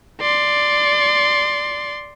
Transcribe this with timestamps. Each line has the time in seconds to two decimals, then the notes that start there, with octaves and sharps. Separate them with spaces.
0.21 D5 C6